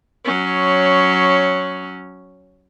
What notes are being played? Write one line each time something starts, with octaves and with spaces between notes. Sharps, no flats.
F#3 C#4